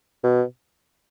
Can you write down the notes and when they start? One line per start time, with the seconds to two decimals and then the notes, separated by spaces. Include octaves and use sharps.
0.24 B2